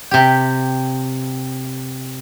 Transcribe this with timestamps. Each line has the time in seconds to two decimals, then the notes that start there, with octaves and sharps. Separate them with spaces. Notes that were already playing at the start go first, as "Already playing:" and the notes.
0.11 C3 G4